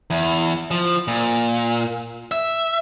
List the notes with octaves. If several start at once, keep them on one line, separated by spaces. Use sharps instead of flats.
E2
F3
A#2
E5